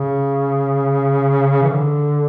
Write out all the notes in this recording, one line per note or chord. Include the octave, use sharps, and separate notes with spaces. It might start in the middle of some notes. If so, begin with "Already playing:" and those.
Already playing: C#3
E3
D3